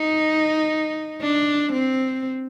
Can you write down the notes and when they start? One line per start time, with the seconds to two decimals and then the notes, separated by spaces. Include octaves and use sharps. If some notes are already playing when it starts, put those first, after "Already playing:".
Already playing: D#4
1.21 D4
1.73 C4